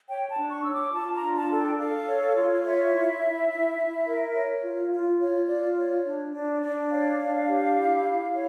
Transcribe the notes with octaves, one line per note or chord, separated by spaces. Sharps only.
C#5 G5
A5
D4
C#6
C#5 E6
D6
F4 A5
A#5
D4
A5
A4
G5
A4 F5
C#5
F4
C#5 E5
E4
E4
E4
E4
A#4
C#5
F4
F4
F4 C#5
F4 D5
C#5
D4
D4
D4
C#5 F5
D4
G4
E4
E4
C#5